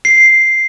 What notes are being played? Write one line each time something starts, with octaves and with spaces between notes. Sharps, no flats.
C7